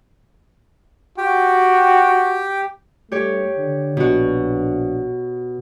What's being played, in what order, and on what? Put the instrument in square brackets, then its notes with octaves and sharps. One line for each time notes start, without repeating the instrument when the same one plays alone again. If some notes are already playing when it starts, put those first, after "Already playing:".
[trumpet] F#4 [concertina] G4 G5
[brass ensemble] G2 A3 [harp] G4 C#5
[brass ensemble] D3
[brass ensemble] A#1 D4 [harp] B2 F#4